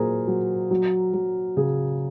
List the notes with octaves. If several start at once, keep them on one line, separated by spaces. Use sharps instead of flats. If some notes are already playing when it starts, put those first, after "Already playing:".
Already playing: A#2 F#3 G#4 A#4 C5
F#3
F#3
F#3
C#3 G#4